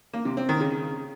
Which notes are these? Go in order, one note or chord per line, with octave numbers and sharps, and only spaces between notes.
A#3
C3
C4
D#3
C#3